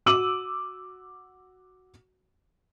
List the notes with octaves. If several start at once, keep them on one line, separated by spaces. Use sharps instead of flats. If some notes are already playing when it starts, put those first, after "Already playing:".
F#4 D6 E6 D#7 F#7